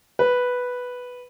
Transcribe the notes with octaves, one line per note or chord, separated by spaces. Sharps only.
B4